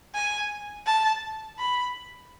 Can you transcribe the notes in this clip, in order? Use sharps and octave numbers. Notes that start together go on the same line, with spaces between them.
G#5
A5
B5